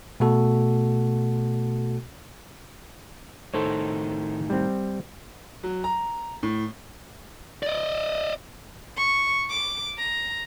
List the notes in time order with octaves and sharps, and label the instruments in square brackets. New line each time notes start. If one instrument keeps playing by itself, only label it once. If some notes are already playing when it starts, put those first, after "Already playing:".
[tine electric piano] B2 A3 F#4 A4
[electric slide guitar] A2 D#3 D#4 [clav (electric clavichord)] A4 C5 C#5
[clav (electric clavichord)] G3 C4
[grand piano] F#3
A#5
A2
[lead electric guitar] D5 D#5
[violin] C#6
D6
A#5